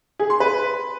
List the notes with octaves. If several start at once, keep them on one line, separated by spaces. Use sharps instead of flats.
G#4
C6
B4